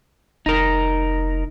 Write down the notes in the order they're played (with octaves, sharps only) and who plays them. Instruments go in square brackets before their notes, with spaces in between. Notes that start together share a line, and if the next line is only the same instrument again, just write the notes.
[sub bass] F1 [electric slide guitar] D#4 A#4